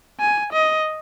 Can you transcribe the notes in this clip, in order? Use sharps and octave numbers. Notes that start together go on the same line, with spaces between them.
G#5
D#5